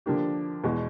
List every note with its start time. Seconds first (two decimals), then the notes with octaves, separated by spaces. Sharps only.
0.06 D3 F3 A#3 D4 G4
0.64 E2 B2 G#3